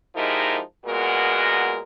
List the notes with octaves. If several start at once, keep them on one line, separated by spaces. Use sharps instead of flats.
F3 G#3 D#4 E4 G4 A#4
A#2 G#3 B3 F#4 A#4